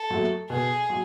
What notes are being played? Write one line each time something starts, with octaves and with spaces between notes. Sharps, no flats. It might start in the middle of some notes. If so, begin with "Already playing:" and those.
Already playing: A4
F#3 A3
B2 G#4
F#3